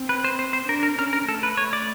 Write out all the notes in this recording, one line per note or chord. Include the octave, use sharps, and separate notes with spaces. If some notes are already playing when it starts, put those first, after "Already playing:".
Already playing: C4
B4
C5
C5
C5
D4 A#4
A#4
C#4 A#4
A#4
A3 A4
B4
A3 C#5
D5